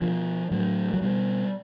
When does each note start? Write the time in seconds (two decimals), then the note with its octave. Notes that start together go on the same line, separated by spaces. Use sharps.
0.01 B2 F3
0.51 A2 F#3
0.94 F#3
1.02 B2 G3